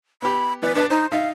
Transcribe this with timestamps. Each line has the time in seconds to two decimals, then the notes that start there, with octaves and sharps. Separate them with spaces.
0.22 B3 G4 B5
0.62 E3 B3 B4 D5
0.75 D4 B4 D5 A5
0.90 D#4 C5
1.12 D#4 E5 F5